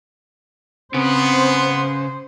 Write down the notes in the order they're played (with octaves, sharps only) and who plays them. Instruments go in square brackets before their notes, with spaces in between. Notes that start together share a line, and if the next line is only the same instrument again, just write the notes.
[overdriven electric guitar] C#3 [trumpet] B3 [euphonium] C4 [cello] C5